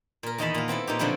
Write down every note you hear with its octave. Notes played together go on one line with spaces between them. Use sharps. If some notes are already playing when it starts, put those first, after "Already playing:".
A#2 A#4
E2 D#3 D#4 D#5 A5 B5
A#2 F5
B3 C4 E4 A4
A#2 D#4 G4
B2 D3 F3 F#3 C4 E4